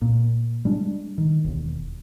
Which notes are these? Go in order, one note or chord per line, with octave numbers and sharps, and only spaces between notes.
A#2
G3 G#3 D4
D#3
E1 D#2